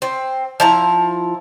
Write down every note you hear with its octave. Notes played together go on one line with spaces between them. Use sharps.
C4
F3 E4 A#5